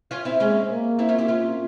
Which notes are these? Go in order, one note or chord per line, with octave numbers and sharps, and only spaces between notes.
C#4 F4
C4 E4
G#3 A#3 C#4
A#3
C4 E4
C#4 F4
E4 G4
A#3 C#4 F4